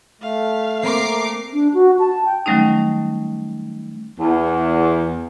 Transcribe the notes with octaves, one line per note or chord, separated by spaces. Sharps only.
A3 F5
A#3 C4 A#4 D6 C7
D4
F#4
A5
G5
D#3 F#3 G3 A3 C#4 D#4
E2